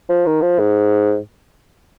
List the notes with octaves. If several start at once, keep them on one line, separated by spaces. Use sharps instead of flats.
F3
D#3
F3
G#2